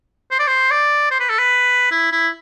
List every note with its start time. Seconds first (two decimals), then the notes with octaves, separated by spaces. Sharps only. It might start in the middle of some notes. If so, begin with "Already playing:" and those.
0.31 C5
0.39 D5
0.47 C5
0.71 D5
1.11 C5
1.20 B4
1.29 A4
1.38 B4
1.91 E4
2.12 E4